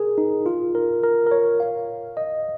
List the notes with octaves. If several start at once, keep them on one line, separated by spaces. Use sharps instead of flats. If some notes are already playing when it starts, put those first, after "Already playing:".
Already playing: G#4 A#4
D#4
F4
A#4
A#4
A#4
C#5
F5
D#5